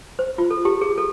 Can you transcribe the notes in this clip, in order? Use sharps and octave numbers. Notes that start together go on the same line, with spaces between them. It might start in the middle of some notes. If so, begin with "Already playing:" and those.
C5
F4
A4
G4
G#4
A4